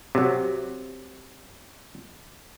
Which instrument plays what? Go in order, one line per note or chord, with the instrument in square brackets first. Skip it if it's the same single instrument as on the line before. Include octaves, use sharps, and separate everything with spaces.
[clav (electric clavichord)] C3 F#3